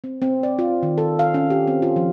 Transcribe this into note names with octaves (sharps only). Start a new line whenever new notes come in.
C4
C4
D5
F4
D#3
A4
F5
C#4
G4
C4
F4
F3